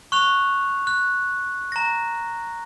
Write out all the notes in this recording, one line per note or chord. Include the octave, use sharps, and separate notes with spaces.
C#6 F#6 F7
F#6
A#5 A#6